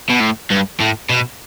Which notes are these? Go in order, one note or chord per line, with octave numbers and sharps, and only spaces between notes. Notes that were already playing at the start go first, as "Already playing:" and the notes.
B2
A2
G2
A2
B2